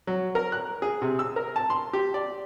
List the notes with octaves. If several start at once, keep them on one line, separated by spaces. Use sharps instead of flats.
F#3
A#4
F#6
G#4
C3
E6
A#4
A5
C6
G4
D5